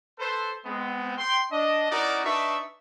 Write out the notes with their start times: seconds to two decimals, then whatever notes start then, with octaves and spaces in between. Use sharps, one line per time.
0.19 A4 B4 C5
0.65 G#3 B3 C4
1.18 G5 C6
1.52 D4 D#5
1.91 C#4 D#4 E4 F#4 A#4 D5
2.25 D4 D#4 B4 E5 C#6